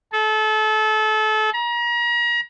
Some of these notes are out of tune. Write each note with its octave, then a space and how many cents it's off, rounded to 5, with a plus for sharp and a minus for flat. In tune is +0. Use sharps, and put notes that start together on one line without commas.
A4 -30
A#5 +35